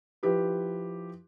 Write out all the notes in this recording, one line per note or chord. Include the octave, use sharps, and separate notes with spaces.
F3 E4 G4 B4